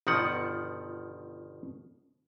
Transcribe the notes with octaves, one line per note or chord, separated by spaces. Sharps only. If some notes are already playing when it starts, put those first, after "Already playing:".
G1 B2 D#3 F3 F#5